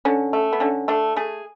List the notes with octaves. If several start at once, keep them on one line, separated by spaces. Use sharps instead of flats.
D3 C#4
A3
B3
D3 C#4
A3 D4
A3 G#4